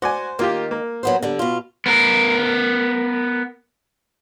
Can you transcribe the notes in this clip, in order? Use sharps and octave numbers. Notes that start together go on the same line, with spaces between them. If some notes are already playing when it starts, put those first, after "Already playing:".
F#4 C5 D5 G#5
D#3 A#3 F4 G4
A#3
F#3 B3 C5
D3 G3
B2 F4
B3 A#4